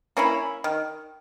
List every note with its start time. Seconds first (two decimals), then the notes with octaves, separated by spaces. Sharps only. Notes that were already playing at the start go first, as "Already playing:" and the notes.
0.17 A#3 C#4 E4
0.64 D#3